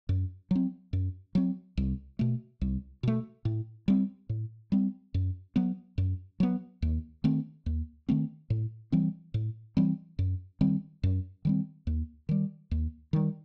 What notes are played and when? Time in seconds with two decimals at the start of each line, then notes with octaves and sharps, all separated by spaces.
0.09 F#2
0.51 F#3 C4
0.93 F#2
1.35 F#3 C4
1.77 C2
2.19 B2 A3
2.61 C2
3.03 B2 A3
3.45 A2
3.88 G3 C4
4.29 A2
4.72 G3 C4
5.14 F#2
5.56 F#3 B3
5.98 F#2
6.40 F#3 B3
6.82 D#2
7.24 D#3 A3 C4
7.66 D#2
8.09 D#3 A3 C4
8.50 A2
8.92 E3 G3 C4
9.34 A2
9.77 E3 G3 C4
10.19 F#2
10.61 D#3 G3 C4
11.03 F#2
11.45 D#3 G3 C4
11.87 D#2
12.29 D#3 G3
12.71 D#2
13.13 D#3 G3